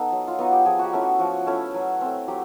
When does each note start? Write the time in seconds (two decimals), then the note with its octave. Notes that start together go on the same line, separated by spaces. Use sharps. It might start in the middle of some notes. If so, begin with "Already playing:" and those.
Already playing: B3 D#4 A4
0.12 F#3
0.28 F4
0.39 B3 D#4 F#4
0.53 G4
0.65 F3 G#4
0.79 F#4 G4
0.93 A3 C#4 E4
1.01 F#4
1.19 F3 F#4
1.46 A3 C#4 E4
1.74 F#3
2.01 A3 C4
2.28 F#3 G4